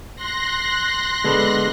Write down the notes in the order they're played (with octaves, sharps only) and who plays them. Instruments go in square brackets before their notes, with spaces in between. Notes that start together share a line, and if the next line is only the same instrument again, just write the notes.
[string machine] C6 F#6 A#6
[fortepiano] D3 B3 [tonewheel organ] G#3